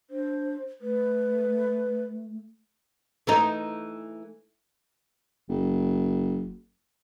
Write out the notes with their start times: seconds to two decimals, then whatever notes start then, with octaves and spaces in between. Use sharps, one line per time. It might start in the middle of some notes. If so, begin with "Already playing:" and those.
0.10 D4 C5
0.81 A3 B4
3.27 E3 A3 D#4
5.49 F#1